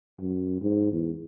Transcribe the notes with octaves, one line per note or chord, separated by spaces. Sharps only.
F#2
G#2
E2